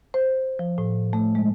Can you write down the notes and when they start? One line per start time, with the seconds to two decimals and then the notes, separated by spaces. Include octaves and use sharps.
0.14 C5
0.59 F3
0.78 A2
1.13 A3
1.35 G#3